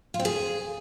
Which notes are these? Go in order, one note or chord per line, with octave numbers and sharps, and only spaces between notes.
F4
C4
G#4